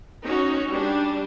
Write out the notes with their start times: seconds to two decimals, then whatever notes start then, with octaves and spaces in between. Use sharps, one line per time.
0.24 C#4 D#4 F#4
0.70 G3 D4